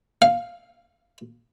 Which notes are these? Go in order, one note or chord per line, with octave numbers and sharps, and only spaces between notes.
F5